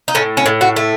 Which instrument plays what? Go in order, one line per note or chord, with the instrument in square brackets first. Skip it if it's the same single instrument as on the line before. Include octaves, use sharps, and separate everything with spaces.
[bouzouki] D#4
A2 C#4
C#4
A2
F#4
A3